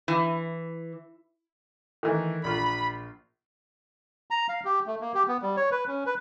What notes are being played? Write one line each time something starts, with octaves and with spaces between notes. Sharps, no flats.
E3
D#3 E3 A3
A#1 F4 B5
A#5
F5
G4
A3
A#3
G4
B3
G3
C#5
B4
C#4
B4